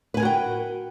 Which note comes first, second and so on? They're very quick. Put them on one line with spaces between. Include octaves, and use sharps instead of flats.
B4 G#5 A#4 F#4 G5